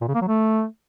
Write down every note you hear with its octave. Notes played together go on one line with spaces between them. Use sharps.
A#2
C#3
A#3
F#3
A3